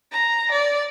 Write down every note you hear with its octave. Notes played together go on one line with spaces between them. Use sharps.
A#5
D5